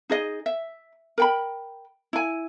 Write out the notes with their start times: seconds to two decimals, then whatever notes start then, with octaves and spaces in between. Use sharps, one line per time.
0.10 D#4 G#4 D#5
0.46 E5
1.18 A#4 G5 B5
2.13 E4 G#5